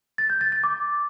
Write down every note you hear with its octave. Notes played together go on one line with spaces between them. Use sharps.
A6
G6
A6
A6
D6